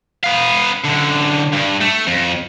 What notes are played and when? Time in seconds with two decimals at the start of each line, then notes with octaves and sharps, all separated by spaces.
0.24 B3 F5
0.85 F#2 D3
1.53 G2
1.81 A3
2.07 F2